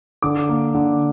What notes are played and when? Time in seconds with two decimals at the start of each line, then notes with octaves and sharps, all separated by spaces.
0.22 D3 D6
0.49 A#3
0.75 D3